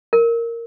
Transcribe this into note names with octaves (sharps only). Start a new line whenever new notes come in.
A#4